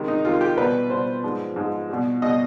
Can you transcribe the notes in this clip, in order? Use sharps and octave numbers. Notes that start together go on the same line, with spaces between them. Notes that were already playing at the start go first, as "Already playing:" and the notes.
Already playing: C3 D#3 G#3
D#4
C3 D#3 G#3 F4
G4
B2 G3 B4
B2 G3 C5
G#2 F3 G#3
G#2 F3 G#3
B2 G3
B2 G3 D#5